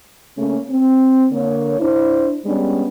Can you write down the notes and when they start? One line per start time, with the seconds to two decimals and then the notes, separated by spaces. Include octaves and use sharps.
0.38 C#3 A3 A#3 C#4
0.70 C4
1.31 D3 A#3 C#5
1.79 D4 E4 C5
2.45 G3 G#3 B3 C#4 D4